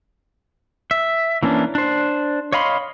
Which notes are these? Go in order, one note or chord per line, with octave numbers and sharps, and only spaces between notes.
E5
E3 A#3 C#4 D4
D4 C5
C#5 D#5 F5 B5 C6